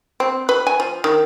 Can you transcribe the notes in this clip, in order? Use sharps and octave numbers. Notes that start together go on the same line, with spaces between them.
C4
B4
G#5
F3
D#3